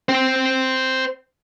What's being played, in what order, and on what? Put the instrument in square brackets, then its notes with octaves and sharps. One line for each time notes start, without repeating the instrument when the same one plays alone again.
[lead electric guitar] C5 G5